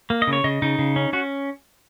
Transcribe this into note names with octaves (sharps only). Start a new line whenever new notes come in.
A#3
D#5
C#3
C#5
C#3 D#5
C#3 D#4
C#3
C#4
C#4 F#4